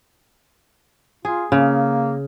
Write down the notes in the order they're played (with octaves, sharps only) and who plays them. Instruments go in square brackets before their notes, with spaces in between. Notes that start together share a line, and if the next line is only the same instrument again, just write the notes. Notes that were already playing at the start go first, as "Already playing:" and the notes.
[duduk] F4 [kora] G#4
[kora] C#3 [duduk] A#3